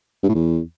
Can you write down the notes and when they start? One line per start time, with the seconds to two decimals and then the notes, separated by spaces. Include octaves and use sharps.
0.23 G2
0.29 A2
0.34 E2